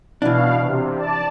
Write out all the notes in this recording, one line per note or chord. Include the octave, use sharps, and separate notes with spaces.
B2 E3 D4 F5
C3
D5 A5